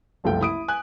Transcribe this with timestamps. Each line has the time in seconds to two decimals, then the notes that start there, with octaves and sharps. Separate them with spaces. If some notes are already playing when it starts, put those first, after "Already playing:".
0.24 F#1 C2 F3 A3 G5
0.41 E4 D#6 D7
0.68 G#5 F#6